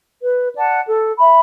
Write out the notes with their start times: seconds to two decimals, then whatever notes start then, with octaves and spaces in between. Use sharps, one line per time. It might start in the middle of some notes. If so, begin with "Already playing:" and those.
0.23 B4
0.55 D5 F#5 A5
0.87 A4
1.19 E5 B5